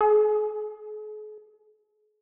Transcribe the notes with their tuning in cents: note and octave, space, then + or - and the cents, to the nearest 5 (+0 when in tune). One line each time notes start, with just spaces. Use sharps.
G#4 +45